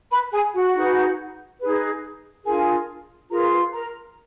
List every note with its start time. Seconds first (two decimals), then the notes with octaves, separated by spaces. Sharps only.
0.10 B4 B5
0.32 G#4 G#5
0.53 F#4 F#5
0.74 D#4 G#4 B4
1.60 D#4 G#4 B4
2.45 D4 F4 G#4 A#4 G#5
3.30 F4 G#4 A#4 B4 A#5
3.73 A#4 A#5